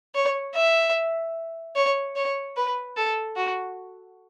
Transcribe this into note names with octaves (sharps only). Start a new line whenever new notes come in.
C#5
E5
C#5
C#5
B4
A4
F#4